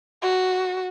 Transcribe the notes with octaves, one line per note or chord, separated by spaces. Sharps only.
F#4